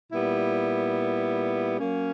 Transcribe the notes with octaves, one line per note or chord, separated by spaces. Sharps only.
A#2 G3 B3 E4
F#3 A#3 C#4